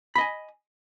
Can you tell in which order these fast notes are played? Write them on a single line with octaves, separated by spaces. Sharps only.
B5 D#5 G#5